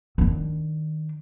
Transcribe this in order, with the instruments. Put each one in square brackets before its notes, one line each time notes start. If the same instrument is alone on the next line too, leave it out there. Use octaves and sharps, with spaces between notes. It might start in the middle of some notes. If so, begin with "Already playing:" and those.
[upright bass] D#3 D4